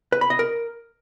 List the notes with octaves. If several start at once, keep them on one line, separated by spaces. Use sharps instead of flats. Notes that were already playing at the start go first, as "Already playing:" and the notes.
B4
B5
D#5
A#4